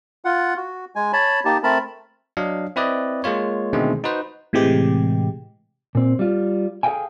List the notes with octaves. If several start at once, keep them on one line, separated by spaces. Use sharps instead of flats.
F4 F#5
F#4
G#3 G#5
C#5 A5 B5
A#3 D#4 G4 A5
A3 C4 A#4 A5 B5
F#3 D4 D#5 F5
C4 E4 B4 D5 D#5
G#3 A#3 F4 C#5
B2 D3 D#3 G#3 A3 C4
D#4 F#4 B4 C5
A2 C3 E3 G#3 G4
A#2 C4
G3 F4
G#4 A4 D#5 F5 G5 G#5